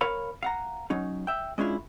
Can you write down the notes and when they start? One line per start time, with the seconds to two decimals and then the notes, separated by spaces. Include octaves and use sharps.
0.01 A#4 C#5 F5 B5
0.43 F5 F#5 A#5
0.90 F#3 C#4 D#4
1.27 E5 G5
1.58 G#3 C#4 D4 E4 F4